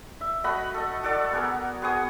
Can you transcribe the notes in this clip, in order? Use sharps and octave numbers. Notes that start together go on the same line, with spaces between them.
E5
A3 F#4 D#5 B5
A4 D#5
F#4 A4 D5
B3 F#4 G#4 A#4
B3 G#4 C#6 D#6